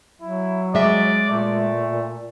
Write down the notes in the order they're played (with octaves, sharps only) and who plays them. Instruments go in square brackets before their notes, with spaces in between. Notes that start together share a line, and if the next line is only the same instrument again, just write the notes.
[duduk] F#3 [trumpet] E4
[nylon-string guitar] G#3 E5 [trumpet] D5
[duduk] A#2 [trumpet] A3